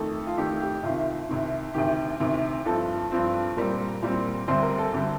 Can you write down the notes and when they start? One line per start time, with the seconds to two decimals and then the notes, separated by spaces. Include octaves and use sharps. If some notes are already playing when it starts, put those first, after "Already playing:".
Already playing: F2 D#3 A3 A4
0.27 F4
0.38 F2 D#3 A3 G4
0.61 G4
0.83 C2 C3 D#3 F4
1.29 C2 C3 D#3
1.74 D2 C3 D#3 G4
2.20 D2 C3 D#3
2.65 G2 F3 C4 A4
3.11 G2 F3 C4
3.56 A#2 G3 C4 A#4
4.02 A#2 G3 C4
4.48 D2 D3 G3 C4 C5
4.62 A#4
4.78 A4
4.93 D2 D3 G3 C4